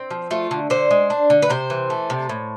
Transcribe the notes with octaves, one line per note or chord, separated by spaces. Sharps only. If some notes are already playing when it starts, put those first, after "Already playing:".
Already playing: C4
F3
A3 F4
D3
D3 C5
G#3
D4
D3
B4
C3 C5
E3
A3
C3
A2